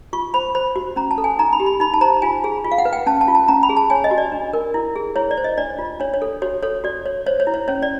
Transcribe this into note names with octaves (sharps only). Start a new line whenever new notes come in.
F4 C#6
C5 B5
C5 B5
F#4
C#4 A#5
A5
A4
G#5
D#4 A#5
B5
G4
B5
D#4 B5
A5
C5 A#5
F4 G#5
G#4
F4
F5
F#5
B4
G5
C#4 A5
A5
F4
A5
C#4 A#5
B5
G#4
A5
C#5 G#5
D#5
F#4
D5
D4
A#4
E4
G#4
E4 C#5
D5
C5
D#5
D4 D5
F4
D4 C#5
C#5
A4
F#4 C#5
A4 C#5
F#4 D5
C#5
C5 C#5
C#5
E4
C#5
C#4 C#5
D5